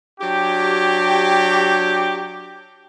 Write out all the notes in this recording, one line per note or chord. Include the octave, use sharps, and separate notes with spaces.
F#3 D4 G4